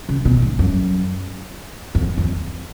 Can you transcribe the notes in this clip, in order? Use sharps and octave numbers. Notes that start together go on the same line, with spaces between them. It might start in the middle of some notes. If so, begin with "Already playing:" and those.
C#3
B2
G#2
F#2
F2
F2